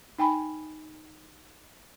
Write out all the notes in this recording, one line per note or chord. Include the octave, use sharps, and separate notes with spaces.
D#4 G5 G#5 B5